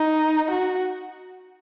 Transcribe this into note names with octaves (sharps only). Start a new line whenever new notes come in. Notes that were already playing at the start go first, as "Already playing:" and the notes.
Already playing: D#4
F#4